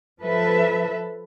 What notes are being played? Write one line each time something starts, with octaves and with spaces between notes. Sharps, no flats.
F3 A4 B4 E5